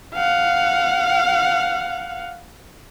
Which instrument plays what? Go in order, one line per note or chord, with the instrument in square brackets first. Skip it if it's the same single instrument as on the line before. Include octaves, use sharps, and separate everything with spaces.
[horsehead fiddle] F5 F#5